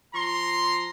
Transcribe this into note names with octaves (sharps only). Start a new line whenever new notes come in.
F3 A#5 C6